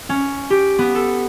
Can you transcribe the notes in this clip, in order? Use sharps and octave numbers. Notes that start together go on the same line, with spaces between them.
C#4
G4
B3
A4